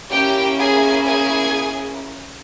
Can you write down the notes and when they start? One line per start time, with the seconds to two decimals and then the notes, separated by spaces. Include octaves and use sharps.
0.10 A#3 C#4 E4 G4 G5
0.58 G#4 G#5
1.06 G#4 G#5